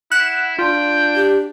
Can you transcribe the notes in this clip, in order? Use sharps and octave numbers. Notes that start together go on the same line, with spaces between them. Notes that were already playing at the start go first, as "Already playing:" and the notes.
E4 F#5 F#6 E7
D4 F4 G5
G4